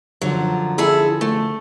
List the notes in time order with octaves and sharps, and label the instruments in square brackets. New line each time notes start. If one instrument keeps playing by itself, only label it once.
[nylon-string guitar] F#2 D3 F3 [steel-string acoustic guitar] F#3
[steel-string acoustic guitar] E4 G#4 A4
A3